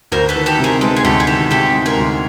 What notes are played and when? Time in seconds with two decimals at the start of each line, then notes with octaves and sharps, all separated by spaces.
0.12 D2 A#4 C5
0.29 A4 B4
0.36 D#3
0.46 G4 A4
0.59 C3
0.64 G#4 A#4
0.81 G#3 A4 B4
0.96 G#4
1.04 D2 G4 A4
1.20 G#4
1.27 D#3 G4 A4
1.51 C3 G4 A4
1.74 G#3
1.86 G#4 A#4
1.97 D2